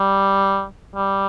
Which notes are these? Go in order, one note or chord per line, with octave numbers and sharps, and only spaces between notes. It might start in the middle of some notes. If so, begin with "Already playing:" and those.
Already playing: G3
G3